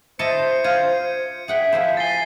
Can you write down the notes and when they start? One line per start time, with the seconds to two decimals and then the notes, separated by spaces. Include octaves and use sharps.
0.19 E4 C5 D#5 A5 C#7 D#7
0.64 F4 G#6 D#7
1.48 G#4 E5 F#5 G5
1.72 F3 E4 C5
1.97 G#5 A6 C7 G7